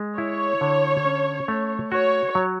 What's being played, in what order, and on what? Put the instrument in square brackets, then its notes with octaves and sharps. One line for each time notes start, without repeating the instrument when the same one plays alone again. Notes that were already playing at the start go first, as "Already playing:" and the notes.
Already playing: [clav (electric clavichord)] G#3
[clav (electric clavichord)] E4 [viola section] C#5
[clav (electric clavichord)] D3
C#4
A3
[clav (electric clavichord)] F#4 [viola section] C#5
[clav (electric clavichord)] F#3